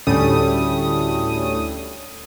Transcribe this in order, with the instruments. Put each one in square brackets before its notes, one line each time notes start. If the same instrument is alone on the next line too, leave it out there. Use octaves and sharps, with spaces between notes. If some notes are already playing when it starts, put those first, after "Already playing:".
[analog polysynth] D2 A2 G3 A3 C#4 D#6